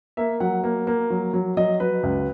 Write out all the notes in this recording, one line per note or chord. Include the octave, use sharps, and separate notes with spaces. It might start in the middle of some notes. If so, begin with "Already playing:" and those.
A#3 E5
F#3 F#5
A#3
A#3
F#3
F#3
F#3 D#5
F#3 B4
C#2